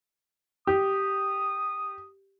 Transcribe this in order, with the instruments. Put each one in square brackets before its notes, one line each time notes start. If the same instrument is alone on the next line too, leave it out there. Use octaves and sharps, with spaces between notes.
[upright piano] G4 [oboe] D#6